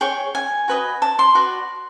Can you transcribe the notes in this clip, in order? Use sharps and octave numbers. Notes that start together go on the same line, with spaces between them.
G#4 C#5 G5
G#5
F#4 B4 D#5
A5
C6
F#4 B4 D5